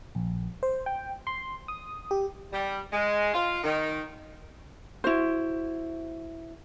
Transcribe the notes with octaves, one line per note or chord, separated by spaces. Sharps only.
A#1
C5
G5
C6
D#6
G4
G3
G#3
F4
D#3
E4 F#4 C5